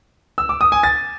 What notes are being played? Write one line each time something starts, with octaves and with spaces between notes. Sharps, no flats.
E6
D6
D#6
G#5
A6